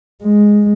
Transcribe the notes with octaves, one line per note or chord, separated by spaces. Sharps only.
G#3